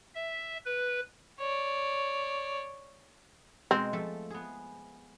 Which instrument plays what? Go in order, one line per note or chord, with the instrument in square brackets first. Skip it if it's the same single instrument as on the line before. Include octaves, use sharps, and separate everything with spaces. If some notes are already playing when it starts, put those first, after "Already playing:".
[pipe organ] E5
B4
[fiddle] C#5 D5
[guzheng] B2 G#3 A#5 [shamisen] C4
[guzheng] F3 A3 A4
B3 G#4